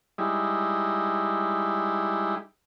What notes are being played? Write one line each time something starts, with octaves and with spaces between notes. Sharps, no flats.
G3 G#3 D#4 E4